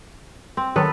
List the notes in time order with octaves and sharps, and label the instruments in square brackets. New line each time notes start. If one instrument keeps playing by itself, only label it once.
[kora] C4
[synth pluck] D#3 F#3 [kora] B3 A4 B4